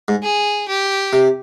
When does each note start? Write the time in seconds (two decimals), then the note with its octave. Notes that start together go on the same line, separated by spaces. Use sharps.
0.08 G#2
0.23 G#4
0.69 G4
1.13 C3